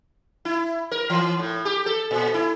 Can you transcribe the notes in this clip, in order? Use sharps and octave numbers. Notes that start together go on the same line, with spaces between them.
E4
A#4
E3
A2
G4
A4
A#2
E4